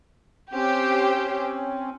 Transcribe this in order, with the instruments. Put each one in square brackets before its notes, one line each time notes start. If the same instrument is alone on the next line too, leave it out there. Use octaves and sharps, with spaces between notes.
[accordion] C4 C#4 [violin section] G4 C5